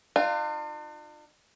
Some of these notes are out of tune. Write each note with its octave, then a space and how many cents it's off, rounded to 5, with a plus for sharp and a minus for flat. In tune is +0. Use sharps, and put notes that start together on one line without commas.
D4 +45 F4 +0